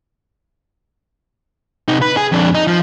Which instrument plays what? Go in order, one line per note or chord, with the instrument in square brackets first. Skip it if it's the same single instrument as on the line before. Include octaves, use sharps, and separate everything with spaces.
[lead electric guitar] C3 D#4
B4
G#4
F2 D4
D#4
F3